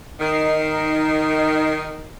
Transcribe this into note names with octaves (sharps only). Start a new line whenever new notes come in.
D#3 D#4 C7